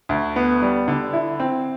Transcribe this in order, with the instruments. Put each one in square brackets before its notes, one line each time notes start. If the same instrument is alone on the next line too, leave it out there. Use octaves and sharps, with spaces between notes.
[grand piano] D2
B3
G3
D3
E4
C4